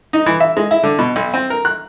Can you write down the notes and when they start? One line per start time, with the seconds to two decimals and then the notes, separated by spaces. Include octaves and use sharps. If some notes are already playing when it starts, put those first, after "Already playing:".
0.13 D#4
0.26 E3
0.40 E5
0.57 G#3
0.71 E4
0.84 D3
0.99 B2
1.16 B1
1.34 C4
1.50 A#4
1.65 F#6